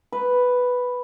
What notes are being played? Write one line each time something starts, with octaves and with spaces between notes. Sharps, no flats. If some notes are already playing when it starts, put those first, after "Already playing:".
B4